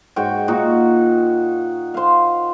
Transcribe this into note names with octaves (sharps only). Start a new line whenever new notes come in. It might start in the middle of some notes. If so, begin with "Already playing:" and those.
G#2 F#4 C#5 G5
A#2 D#4 F#4
C5 F5